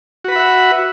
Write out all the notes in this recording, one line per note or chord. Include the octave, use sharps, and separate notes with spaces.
F#4 B4 E5 F#5 B5